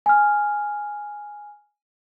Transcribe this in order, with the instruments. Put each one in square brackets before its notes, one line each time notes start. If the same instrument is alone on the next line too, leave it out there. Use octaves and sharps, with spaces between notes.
[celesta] G#5 F6